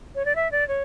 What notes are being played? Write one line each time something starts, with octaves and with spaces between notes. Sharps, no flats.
C#5
D5
E5
D5
C#5